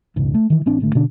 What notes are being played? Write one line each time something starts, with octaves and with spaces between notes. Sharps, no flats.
E1 C#2 G#2
A3
D#3 E3
A1 C4 D4
G#1 D3 A3
B2 D3 D4